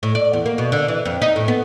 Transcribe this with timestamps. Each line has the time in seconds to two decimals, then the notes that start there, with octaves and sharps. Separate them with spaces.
0.03 A2
0.15 D5
0.33 E2
0.46 A#3
0.58 B2
0.72 D3
0.88 E3
1.05 F2
1.22 D#4
1.36 A2
1.48 B3